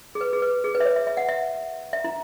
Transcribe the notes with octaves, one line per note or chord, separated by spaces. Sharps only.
G#4
B4
G#4
B4
G#4
B4
E5
C#5
E5
E5
F#5
E5
E5
E4